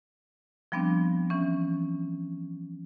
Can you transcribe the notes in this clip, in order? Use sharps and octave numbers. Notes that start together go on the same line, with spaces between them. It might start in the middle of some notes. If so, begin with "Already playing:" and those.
F3 G3 B3 C4 D4
E3 C#4